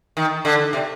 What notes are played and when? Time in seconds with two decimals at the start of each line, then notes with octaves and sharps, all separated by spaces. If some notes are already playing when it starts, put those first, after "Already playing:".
0.17 D#3
0.45 D3
0.73 C3